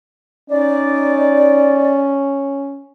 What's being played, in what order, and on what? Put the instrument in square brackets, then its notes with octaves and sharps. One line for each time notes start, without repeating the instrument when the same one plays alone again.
[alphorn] C#4 [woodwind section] D#4 D5